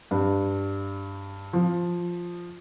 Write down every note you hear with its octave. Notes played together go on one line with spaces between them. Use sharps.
G2
F3